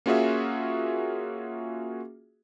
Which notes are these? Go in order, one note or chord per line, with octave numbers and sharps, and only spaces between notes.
A#3 C#4 F4 F#4 G#4 E5